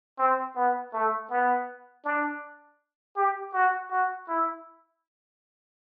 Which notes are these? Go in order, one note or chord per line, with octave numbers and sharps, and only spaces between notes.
C4
B3
A3
B3
D4
G4
F#4
F#4
E4